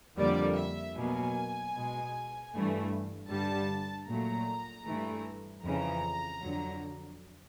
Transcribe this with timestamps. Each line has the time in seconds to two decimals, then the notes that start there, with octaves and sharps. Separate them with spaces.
0.17 F2 D3 G3 A#3 D5
0.56 E5
0.96 B2 F#3 A#3 G#5
1.75 B2 G#3
2.52 G2 E3 A3
3.30 G2 D3 G3 A5
4.07 A#2 F#3 A3 A#5
4.86 G2 E3 A3
5.64 F2 C#3 E3 A#5
6.42 F2 D3 F#3